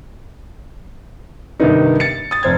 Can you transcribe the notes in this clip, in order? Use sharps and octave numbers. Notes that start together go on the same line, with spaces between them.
G2 C3 D#3 B3 D#4
A6 C#7
D#6 A6
F1 C5 G#6